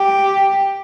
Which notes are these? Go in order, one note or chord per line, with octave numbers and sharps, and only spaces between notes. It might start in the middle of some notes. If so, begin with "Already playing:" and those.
Already playing: G4